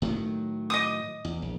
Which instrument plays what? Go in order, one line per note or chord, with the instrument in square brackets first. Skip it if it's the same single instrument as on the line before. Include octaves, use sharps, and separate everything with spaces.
[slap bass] A2 D#3 F#3
[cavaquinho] D#5 D6 D#6
[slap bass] E2
A#1